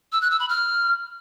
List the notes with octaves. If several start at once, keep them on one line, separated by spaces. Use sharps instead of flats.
E6
F#6
E6
B5
F6